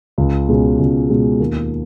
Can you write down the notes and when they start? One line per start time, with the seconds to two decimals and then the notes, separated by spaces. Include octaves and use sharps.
0.18 C#2
0.48 B2 G#3 C#4
0.79 C#2
1.10 B2 G#3 C#4
1.40 D#2